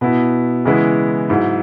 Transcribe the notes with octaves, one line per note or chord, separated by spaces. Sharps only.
B2 B3 E4
C#3 E3 G#3 B3 E4
G#2 F#3 E4